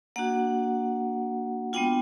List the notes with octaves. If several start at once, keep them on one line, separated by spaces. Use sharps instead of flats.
A#3 D4 F#4 F#5
G#3 B3 D4 F4 G5